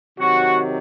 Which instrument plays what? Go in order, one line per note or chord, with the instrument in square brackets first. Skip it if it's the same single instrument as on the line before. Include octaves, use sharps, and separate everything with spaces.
[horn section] C3 D#3 F#3 F#4